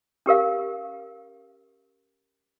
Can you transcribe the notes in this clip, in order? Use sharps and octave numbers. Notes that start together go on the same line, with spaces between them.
C#4 G4 A#4 F5